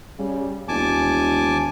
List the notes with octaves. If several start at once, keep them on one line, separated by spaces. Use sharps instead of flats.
C#3 G3
E1 D#2 G#5 A5 D6